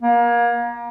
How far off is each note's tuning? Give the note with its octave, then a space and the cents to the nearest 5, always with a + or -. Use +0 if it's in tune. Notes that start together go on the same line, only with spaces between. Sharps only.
A#3 +30